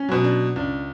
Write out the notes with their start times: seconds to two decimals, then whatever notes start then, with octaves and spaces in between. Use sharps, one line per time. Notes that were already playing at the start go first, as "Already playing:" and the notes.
Already playing: C#4
0.09 B2 F#3
0.24 D4
0.56 C#2 D4